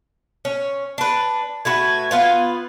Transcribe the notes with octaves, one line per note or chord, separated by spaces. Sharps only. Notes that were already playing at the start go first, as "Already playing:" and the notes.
C#4
D4 B4
A3 F#4 B4 G#6
B3 F4 B4